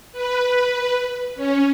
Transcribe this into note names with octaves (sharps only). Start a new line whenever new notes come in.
B4
C#4